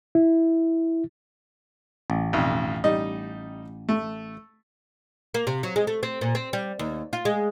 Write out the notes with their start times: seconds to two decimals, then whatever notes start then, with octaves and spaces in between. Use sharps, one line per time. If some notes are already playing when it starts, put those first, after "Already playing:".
0.15 E4
2.10 A1
2.33 B1 F2
2.84 G3 D#4 D#5
3.89 A3
5.34 A#3
5.47 C3
5.63 F#3
5.76 G#3
5.87 A3
6.03 C4
6.21 A#2
6.35 C4
6.53 G3
6.79 D#2
7.13 F4
7.25 G#3